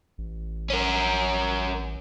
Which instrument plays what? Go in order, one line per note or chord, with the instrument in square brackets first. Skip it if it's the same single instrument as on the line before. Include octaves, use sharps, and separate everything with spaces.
[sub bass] A1
[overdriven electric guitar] C#4 A#4